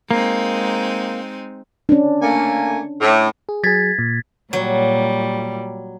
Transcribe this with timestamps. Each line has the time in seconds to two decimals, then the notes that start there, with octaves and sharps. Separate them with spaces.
0.11 G#3 A#3 C4 D#4
1.89 C#4 D4
2.22 A3 A#3 G#5
3.01 A2
3.49 G#4
3.64 F#3 G#4 G#6 A6 B6
3.99 A#2
4.53 A#2 F#3 G3